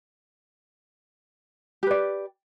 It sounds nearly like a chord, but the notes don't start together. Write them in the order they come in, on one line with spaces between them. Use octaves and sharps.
G4 B4 D5